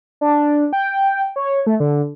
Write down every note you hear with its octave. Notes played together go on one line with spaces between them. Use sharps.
D4
G5
C#5
A3
D3